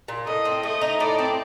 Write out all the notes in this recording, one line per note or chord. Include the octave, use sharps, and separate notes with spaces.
A#2
A2 D#5
C4
A3 D#5
D#4
A2 D5
C4